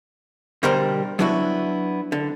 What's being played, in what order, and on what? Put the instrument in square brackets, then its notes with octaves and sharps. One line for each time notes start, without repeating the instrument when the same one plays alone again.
[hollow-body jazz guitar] B2 D3 G3 A#4 C5 C6
F#3 B3 D4 E4 F#4
D3